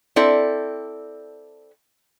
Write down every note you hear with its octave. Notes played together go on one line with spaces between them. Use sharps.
C4 E4 A4 D5